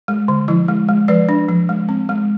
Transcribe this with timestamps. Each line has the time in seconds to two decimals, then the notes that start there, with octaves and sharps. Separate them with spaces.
0.08 G#3
0.28 D3
0.48 F3 E4
0.68 G#3
0.88 G#3
1.08 F3 B4 D5
1.29 D4
1.49 F3
1.69 G#3
1.89 C4
2.09 G#3